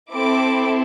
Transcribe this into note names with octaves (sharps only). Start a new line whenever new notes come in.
C4 E4 A4 D6